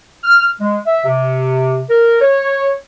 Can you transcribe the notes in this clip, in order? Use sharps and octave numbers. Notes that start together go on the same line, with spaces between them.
F6
G#3
E5
C3
A#4
C#5